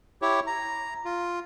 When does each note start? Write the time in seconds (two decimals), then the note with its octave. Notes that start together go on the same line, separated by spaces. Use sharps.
0.22 E4 G4 C#5
0.47 A#5
1.05 F4